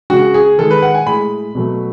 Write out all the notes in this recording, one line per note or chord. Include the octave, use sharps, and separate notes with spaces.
C#3 G#3 F#4
G#4
D#3 G#3 A4
B4
F#5
G#5
A2 G#3 B5
B2 F#3 A3